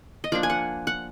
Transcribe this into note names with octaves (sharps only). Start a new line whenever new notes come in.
D#5
F3 A#3 D4 D5
G#5
F#5
F#5